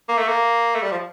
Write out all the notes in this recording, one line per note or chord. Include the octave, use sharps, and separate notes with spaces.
A#3
A3
A#3
A3
G3
F3